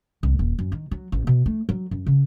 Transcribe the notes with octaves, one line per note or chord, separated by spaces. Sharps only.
C2
D#1
F#2
D#3
F#3
A1
B2
A3
F#3
F#2
C#3